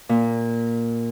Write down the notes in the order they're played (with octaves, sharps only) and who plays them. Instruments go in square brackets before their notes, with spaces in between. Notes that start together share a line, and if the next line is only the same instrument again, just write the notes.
[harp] A#2